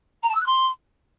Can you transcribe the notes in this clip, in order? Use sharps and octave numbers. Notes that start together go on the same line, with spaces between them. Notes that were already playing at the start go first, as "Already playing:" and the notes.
A#5
A5
E6
F#6
C6